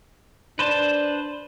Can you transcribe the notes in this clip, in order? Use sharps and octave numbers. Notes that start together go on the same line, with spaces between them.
D4 B4 C5 A5